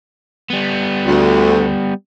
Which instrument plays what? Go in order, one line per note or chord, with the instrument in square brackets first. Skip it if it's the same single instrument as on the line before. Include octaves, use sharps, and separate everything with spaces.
[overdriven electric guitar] G3 B3
[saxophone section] D2